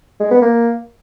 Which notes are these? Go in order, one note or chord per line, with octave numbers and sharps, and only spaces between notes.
G#3
B3
A#3